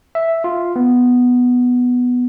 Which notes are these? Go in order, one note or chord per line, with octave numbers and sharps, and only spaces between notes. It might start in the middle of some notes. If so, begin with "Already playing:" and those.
E5
F4
B3